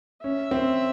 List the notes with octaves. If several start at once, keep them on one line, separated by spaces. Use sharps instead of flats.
C#4 E5
C4